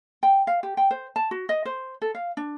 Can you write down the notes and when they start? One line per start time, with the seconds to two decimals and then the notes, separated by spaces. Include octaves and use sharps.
0.23 G5
0.47 F5
0.63 G4
0.77 G5
0.91 C5
1.16 A5
1.31 F#4
1.49 D#5
1.65 C5
2.02 A4
2.15 F5
2.37 D4